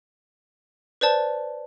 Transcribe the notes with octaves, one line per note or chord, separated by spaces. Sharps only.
B4 C5 D5 A5